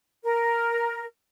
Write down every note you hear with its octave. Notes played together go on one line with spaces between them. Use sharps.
A#4